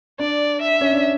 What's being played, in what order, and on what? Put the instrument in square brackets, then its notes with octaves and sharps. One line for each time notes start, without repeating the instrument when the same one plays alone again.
[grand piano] D4 [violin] D5
[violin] E5
[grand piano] C#4
D4